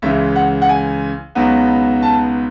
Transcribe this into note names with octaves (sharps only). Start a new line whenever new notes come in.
C#2 C#3 E3 G#3 E5
F#5
F#5
G#5
C#2 B2 F#3 B3 D#4
A5